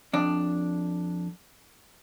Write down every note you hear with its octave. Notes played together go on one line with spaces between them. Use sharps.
F2 D4